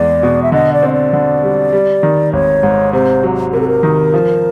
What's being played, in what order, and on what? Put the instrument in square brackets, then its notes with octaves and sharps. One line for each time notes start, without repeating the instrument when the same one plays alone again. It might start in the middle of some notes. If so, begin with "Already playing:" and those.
Already playing: [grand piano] E2 G#3 [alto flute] D5
[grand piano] B2
[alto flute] E5
[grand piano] D3 [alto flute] D#5
[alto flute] D5
[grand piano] C4 [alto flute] D#5
[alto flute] D5
[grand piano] D3
G3
G3
D#3
[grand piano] G#1 [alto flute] C#5
[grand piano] G#2
[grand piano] C3 [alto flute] C5
[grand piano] F#3
[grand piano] C3 [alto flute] A#4
[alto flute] A4
A#4
[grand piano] D#3
F3